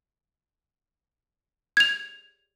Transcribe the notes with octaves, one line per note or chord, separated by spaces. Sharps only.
G#6 F7